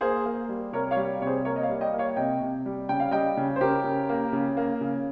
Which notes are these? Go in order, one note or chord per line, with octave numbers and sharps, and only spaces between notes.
A#3 G#4 C5
A#3
G3
C3 A#4 C#5
C#5 F5
G3
C3 G#4 C5 C#5
A#3 A#4 C#5
D#5
C#5 F5
G3
D#5 G5
A#3
C#5 F5
C3 D#5 G5
C3
G3
C#3 G5
F5
G3 D#5 G5
C#3
C5
C#3 G4 A#4
C#3
A#3
C#3
A#3
C#3